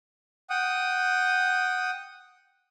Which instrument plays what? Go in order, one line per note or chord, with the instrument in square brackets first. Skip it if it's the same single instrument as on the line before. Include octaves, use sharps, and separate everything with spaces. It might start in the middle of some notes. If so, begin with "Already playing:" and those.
[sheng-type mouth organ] F#5 G5 D#6